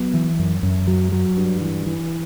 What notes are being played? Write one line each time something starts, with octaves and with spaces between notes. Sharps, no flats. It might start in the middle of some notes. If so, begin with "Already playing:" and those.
Already playing: F#3 B3
E3
F#2
F#2
F#3
F#3
G2
E3
E3